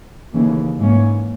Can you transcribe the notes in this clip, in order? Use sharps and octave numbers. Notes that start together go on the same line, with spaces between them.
D#2 C#3 E3
G#2 E3 A#3 C#4